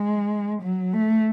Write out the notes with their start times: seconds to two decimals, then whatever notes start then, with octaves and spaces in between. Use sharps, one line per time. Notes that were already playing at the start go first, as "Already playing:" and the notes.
Already playing: G#3
0.62 F#3
0.93 A3